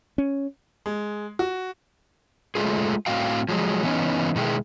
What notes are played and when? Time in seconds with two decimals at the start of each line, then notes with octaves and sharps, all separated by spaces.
0.18 C#4
0.86 G#3
1.39 F#4
2.55 G#3 A3 F4 G#4
3.06 A2 C4 F#4 F5 G5
3.49 F3 F#3 G#3
3.83 E3 B3 C#4 D#4
4.36 B2 D#3 G#3 E4 G#4 G5